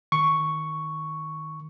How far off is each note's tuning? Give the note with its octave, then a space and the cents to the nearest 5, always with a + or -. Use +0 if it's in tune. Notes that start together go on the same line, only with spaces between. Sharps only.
D#3 +0 C#6 +0